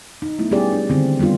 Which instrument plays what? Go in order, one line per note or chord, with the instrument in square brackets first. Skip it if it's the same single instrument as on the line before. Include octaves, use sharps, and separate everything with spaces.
[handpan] D#4
F#3 A3 B3 E4
G3 B3 C#4 G4 G#4 D5
D4
D3 D#3 C4
G3 B3 D4 F4